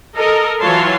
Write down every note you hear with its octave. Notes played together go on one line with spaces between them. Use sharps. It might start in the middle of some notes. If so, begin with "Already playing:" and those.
A4 A#4 D#5
E3 F#3 F4 C#5 A5 C6